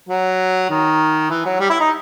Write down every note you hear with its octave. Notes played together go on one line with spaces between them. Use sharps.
F#3
D#3
E3
F#3
G3
E4
D#4